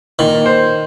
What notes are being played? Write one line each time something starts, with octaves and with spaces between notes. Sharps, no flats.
A#2 D#3
C5